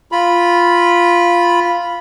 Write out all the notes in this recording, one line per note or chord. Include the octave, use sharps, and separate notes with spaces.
F4 B5